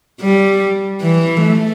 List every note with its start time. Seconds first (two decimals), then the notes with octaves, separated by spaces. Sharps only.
0.21 G3
1.02 E3
1.43 A3